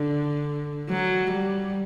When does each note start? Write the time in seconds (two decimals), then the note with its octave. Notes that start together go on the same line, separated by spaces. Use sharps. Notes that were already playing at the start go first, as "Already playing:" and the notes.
Already playing: D3
0.89 F#3
1.31 G3